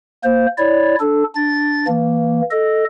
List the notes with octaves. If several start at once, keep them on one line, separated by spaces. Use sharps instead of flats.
A#3 C5
E4 C#5 D5
D4 A4
D4 A6
E3 A#3
A4 D#5